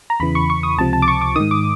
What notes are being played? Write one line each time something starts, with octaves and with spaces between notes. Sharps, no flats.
A#5
E2 C#3 E3 B5
C#6
C#6
D#6
C#2 C3 F3 A5
A5
D6
C#6
D6
G#2 D#3 D#6
D6